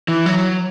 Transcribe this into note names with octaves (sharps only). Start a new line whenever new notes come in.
E3
F#3